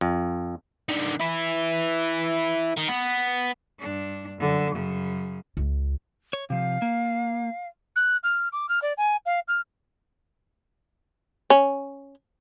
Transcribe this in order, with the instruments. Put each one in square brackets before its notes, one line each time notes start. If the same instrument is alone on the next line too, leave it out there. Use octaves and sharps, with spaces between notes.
[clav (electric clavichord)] F2
[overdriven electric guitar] D#3 D4
E4 B4
D#3
B3
[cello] G2 D4
F#2 D3
F#2 C#3
[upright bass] C#2
[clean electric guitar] C#5
[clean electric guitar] C3 F3 [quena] F5
[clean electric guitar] A#3
[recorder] F#6
F6
D6
F6
D5
G#5
F5
F6
[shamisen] C#4